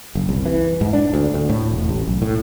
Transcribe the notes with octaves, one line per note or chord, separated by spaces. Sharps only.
F#1
C2
E3
G#2
D4
D2
D2
A2
E1
A1
B1
A2